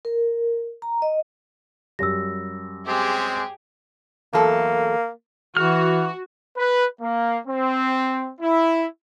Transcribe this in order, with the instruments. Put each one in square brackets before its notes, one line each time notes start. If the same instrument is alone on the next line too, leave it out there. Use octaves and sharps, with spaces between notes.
[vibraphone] A#4
A#5
D#5
[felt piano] F#2 G3 [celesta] E6 A#6
[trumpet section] G#3 C4 [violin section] G4 G#4
[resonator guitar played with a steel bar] E2 F#3 A4 [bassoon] A#3
[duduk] E3 [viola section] F#4 [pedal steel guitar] F6
[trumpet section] B4
A#3
C4
E4